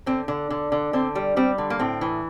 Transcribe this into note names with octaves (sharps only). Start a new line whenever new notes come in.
D3 C4
D3
D3
D3
D3 C4
G3
G3 C4
D3
A#3
A2 C4
E3